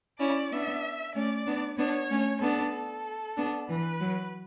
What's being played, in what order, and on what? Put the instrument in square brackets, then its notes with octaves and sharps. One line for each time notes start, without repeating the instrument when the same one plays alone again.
[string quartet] C#4 E4 [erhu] D5
[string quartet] B3 D4 [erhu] E5
[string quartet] A3 C#4 [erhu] D5
[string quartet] B3 D4
[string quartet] B3 D4 [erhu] C#5
[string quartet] A3 C#4
[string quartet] B3 D4 [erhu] A4
[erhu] A4
[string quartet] B3 D4
[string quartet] E3 [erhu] B4
[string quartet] F#3